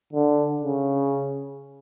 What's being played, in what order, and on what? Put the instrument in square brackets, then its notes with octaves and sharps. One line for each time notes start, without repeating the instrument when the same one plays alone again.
[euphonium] D3
C#3